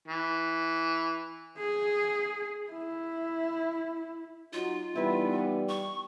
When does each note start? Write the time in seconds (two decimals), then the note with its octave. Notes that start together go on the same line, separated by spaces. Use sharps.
0.08 E3
1.57 G#4
2.71 E4
4.53 F#3 D#4 F4
4.95 E3 G3 B3 D#4 E4 B4
5.69 C#6